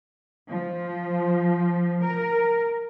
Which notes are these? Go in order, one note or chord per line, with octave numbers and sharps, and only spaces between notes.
F3
A#4